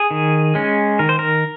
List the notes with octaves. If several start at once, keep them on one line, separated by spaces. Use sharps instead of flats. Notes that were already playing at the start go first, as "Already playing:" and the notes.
Already playing: G#4
D#3
G#3 C#4
D#3 A#4
C5
A#4